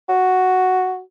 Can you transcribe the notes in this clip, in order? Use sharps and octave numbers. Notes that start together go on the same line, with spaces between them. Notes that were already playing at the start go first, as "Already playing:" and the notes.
F#4